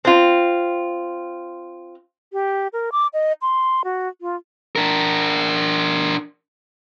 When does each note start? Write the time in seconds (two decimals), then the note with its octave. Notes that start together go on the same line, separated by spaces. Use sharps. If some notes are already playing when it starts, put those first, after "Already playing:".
0.05 C4 F4
2.33 G4
2.73 A#4
2.92 D6
3.14 D#5
3.42 C6
3.84 F#4
4.21 F4
4.76 D4 A#4